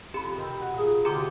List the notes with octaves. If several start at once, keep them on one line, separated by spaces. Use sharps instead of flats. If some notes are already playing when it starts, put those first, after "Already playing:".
F2 G4 B5
D#3 C4
F#4
A#2 G#4
D2 G4 F5 G5 A#5 D6